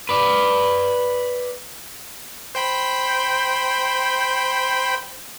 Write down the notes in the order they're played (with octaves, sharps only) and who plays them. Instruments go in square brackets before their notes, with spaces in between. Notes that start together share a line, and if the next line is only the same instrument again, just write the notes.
[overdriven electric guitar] B4 D5
[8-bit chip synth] C5 G5 B5